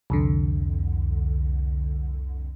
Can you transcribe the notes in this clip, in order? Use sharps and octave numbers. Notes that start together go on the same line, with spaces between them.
C2 F2 D3